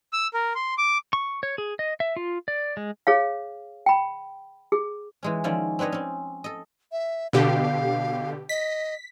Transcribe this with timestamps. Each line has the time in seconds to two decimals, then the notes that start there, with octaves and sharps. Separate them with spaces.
0.13 E6
0.34 A#4
0.55 C6
0.78 D6
1.13 C#6
1.43 C#5
1.58 G#4
1.79 D#5
2.00 E5
2.16 F4
2.48 D5
2.77 G#3
3.07 G#4 C#5 F5
3.86 G5 B5
4.72 G#4
5.23 E3 G#3 C#4
5.44 D#3 F3 C#4 E4 D5
5.79 C4 D4 B4 C#5 D#5
5.92 C4 C#4
6.44 A4 D#5
6.92 E5
7.33 B2 D3 G4 F5
8.49 D#5 B6